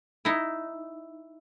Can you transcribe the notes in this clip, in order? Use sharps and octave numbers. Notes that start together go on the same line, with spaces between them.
D#4 E4